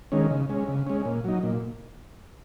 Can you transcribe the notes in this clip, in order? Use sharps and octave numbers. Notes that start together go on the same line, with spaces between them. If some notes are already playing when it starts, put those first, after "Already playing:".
D#3 G#3 C#4
C#3
G#3 C#4
C#3
G#3 C#4
A#2
F#3 D#4
A#2